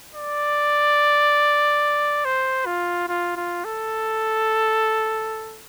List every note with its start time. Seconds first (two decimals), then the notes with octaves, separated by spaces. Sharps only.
0.15 D5
2.25 C5
2.66 F4
3.08 F4
3.36 F4
3.65 A4